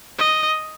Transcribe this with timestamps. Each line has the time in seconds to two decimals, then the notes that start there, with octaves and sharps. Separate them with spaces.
0.19 D#5